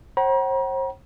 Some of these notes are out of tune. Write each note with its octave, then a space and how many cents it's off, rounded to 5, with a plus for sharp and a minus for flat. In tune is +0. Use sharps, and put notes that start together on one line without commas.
C5 +40 F#5 +45 A#5 +40